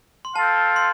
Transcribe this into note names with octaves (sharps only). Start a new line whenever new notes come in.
C6
C4 F4 A4 F5 A5
C6